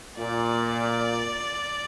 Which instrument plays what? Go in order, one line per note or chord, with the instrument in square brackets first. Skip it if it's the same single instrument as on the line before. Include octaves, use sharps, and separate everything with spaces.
[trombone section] A#2 [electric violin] D5